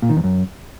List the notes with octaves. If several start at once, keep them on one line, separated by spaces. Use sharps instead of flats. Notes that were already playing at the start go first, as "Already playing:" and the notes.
A#2
D#3
E2
F#2